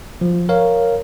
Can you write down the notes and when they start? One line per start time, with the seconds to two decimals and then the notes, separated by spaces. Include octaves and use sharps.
0.21 F3
0.49 A#4 C#5 F5